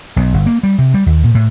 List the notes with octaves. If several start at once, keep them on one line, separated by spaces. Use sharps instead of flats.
B1
G1
A#3
G3
C3
G3
D#2
A#2
A2